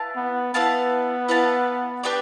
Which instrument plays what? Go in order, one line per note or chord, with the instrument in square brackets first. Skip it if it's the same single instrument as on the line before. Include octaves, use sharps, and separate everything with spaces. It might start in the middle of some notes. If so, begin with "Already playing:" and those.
Already playing: [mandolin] E4 B4 F5 A5
[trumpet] B3
[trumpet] B3 [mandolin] E4 B4 F5 A5
[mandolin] E4 B4 F5 A5
D4 G4 B4 D5